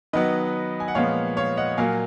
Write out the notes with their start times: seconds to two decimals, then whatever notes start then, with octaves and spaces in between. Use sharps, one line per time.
0.13 D#3 F#3 B3 B4 D#5
0.80 G#5
0.88 F#5
0.95 A#2 F3 G#3 B3 C#5 F5
1.37 C#5 F5
1.57 D#5 F#5
1.77 A#2 F#3 A#3 F5 G#5